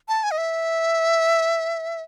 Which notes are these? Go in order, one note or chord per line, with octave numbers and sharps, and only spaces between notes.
A5
G#5
D#5
E5